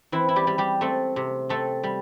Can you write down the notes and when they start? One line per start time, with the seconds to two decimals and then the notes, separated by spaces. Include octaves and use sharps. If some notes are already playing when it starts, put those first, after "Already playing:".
0.12 E3 C4 E4
0.29 E4
0.36 G3 G4
0.47 G3
0.58 G3 G4
0.81 A3 C4 A4
1.16 C3
1.49 A3 C4 A4
1.83 G3